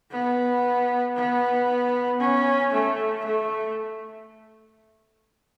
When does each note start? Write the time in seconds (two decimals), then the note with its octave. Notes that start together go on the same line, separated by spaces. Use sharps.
0.11 B3
1.16 B3
2.20 C#4
2.72 A3
3.25 A3